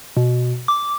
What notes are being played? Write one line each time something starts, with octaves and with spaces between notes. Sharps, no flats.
B2
D6